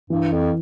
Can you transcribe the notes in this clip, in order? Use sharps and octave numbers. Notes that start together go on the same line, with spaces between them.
G2 E3
F2